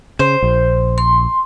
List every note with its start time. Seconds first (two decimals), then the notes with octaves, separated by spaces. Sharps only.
0.19 C#3 C5
0.42 A#1
0.98 C6